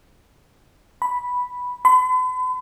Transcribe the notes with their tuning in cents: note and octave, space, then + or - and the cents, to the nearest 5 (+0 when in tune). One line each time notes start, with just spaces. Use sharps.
B5 -5
B5 +40